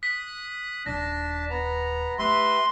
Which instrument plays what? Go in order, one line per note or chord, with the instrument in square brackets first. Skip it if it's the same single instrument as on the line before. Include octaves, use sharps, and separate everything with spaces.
[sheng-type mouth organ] D#6 F#6 [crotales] B6
[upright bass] D#1 [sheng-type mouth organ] D4 A5 [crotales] A#6
[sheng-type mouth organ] B3 A#5
[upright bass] A3 [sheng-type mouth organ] G4 B4 E5 [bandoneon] C6